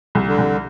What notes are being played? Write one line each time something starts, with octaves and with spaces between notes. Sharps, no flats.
C2
D3
C2